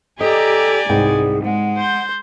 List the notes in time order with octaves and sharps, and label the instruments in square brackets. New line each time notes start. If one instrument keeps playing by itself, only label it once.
[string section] G4 A#5 [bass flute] A4 [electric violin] D5 G#5 [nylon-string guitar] D#5
[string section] C2 [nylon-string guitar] G#2 B3 G5 [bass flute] G#4
[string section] G#3 [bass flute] F#5
[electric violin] C5 G6